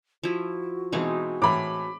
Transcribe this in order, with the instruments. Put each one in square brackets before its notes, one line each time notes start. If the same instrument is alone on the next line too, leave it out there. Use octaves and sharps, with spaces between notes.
[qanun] F3 E4 [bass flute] F#4
[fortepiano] B2 E3 [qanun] G#3 C4 D#4
[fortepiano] A2 E3 [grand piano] B5 D6